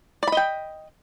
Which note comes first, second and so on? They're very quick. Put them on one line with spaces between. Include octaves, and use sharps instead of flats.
D5 B5 D#5 G5